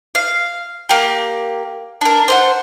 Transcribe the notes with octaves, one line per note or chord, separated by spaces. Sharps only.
F5
A#3 G4
D4 A#4
C5 E5 F#5